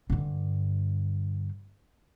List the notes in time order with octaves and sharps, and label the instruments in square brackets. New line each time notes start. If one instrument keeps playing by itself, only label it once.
[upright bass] G2 D3